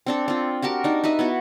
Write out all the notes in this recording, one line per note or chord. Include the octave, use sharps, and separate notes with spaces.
C4 D4 A4
C4 F4
F#4 G4 A#4 A5
D4 D#4
D#4 B4 D#5 E5
B3 E4 F#4